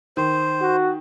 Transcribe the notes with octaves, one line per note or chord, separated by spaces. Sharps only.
D#3 C5
F#4